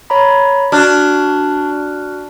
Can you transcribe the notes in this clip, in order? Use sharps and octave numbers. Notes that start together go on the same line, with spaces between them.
C#5 A#5 B5
D4 F#4 F6 F#6